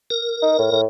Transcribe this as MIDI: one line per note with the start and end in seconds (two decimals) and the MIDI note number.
0.11 0.81 70
0.42 0.57 63
0.59 0.68 45
0.72 0.85 45